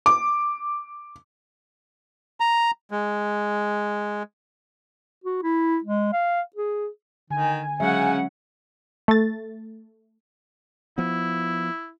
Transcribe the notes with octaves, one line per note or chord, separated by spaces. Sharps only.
D6
A#5
G#3
F#4
E4
G#3
F5
G#4
D3 D#3 G#5
C#3 F#3 G#3 C#4 E5 F#5
A3 A6
F3 B3 E4